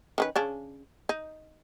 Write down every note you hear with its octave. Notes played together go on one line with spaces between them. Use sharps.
D#3 C#4 B4
C#3 C#4 D4
D#4